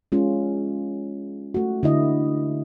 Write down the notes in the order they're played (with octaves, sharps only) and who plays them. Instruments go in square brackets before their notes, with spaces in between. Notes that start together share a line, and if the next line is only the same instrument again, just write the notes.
[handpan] G#3 C#4 F4
A3 F#4
D3 E4 D#5